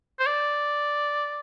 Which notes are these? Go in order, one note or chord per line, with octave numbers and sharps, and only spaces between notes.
C5
D5